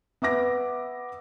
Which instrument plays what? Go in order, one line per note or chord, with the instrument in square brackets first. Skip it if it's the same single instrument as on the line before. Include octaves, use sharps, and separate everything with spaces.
[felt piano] B3 E5 D6 A#6